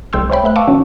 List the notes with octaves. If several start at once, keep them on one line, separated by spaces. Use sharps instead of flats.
C2 G#3 G5 C6 E6
C5 C#5 E5 G5 B5
A3 B4 E5 F#6
F5 A5 C#6 D6 E6
B2 D#3 C#4 F#4